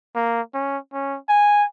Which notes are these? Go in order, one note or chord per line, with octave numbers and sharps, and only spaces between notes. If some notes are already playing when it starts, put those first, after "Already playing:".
A#3
C#4
C#4
G#5